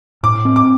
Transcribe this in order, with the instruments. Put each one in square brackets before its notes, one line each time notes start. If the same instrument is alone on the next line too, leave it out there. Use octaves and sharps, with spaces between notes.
[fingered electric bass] A2 [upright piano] D6
[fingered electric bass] C4
[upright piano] D6